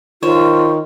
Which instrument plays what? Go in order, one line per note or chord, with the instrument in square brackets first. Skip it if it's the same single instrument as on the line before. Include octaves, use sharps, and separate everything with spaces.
[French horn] D#3 [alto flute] F4 [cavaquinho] C5 C#5